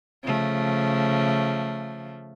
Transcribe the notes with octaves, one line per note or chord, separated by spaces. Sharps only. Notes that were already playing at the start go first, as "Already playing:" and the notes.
C#3 F3 A3